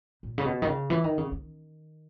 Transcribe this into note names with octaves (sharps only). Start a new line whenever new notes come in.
A#2
C#3
B2
D#3
C#3
E3
D#3
C#3
D#3